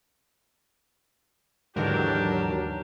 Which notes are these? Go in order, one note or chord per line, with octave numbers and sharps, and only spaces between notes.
D#2 G#2 D3 E3 F#3 D4 G4 A#4